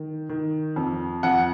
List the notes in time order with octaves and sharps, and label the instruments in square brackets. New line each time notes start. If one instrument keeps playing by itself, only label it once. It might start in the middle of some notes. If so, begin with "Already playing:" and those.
Already playing: [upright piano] D#3
D#3
F2
F2 F#5